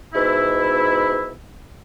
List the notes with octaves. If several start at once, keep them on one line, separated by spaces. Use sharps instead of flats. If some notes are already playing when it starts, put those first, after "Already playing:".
G#2 B2 E4